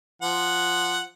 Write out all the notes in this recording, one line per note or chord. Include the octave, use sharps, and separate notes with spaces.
F3 F#5